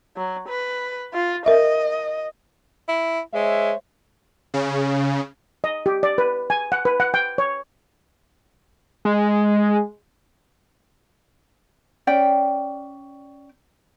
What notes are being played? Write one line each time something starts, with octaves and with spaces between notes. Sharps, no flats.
F#3
B4
F4
A#4 D#5 E5
E4
G#3 C5 C#5 E5
C#3
D#5
G4
D5
B4
G#5
F#5
B4
F#5
G5
C#5
G#3
C#4 D5 G5